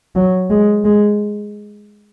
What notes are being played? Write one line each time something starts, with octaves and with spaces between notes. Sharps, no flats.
F#3
G#3
G#3